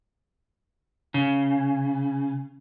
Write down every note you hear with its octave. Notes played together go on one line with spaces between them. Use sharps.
C#3